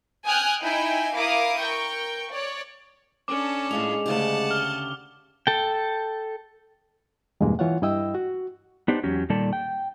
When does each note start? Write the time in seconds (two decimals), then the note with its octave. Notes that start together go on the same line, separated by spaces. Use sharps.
0.25 G5 G#5 D#6 F6 F#6 G#6
0.61 D#4 E4 G5 G#5 B5
1.12 E4 A#4 F5 D6 D#6
1.59 A#4 G5 C#6
2.29 C#5 D5
3.28 C#4 D4 A4 D6 F#7
3.71 A2 G#3 F4 G#4 F7
4.06 D2 C#3 G4 F#5 A5
4.51 F6 G7
5.47 A4 G5
7.41 E2 G2 B2 G#3 A#3
7.59 E3 F4 C#5 F#5
7.82 G2 E4 D#5 G5 E6
8.15 F#4
8.88 B3 D4 D#4 G4 C5
9.04 E2 F#3 C#4 G4
9.30 A#2 D#3 G3 A4 D5 A5
9.53 G5